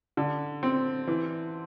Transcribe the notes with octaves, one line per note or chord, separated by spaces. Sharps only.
D3
C4
E3